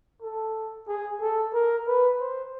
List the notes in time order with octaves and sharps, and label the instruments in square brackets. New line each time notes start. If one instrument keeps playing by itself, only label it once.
[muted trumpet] A4
G#4
A4
A#4
B4
C5